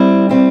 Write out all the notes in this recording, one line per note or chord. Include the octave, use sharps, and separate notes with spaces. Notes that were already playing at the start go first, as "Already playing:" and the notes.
Already playing: G3 C4 E4
G3 C4 E4